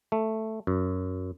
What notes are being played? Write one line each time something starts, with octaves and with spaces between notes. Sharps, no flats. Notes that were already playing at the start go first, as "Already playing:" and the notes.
A3
F#2